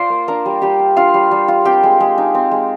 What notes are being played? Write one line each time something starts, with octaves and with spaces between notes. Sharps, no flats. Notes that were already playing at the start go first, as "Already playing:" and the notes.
Already playing: F4 C5 D5 C6
A#3
D4 A#4 A#5
G3
G3 G4 G5
F4
D4 F4 F5
G3
G3
F4
C4 G4 G5
G#3
G#3
D#4
C4
G#3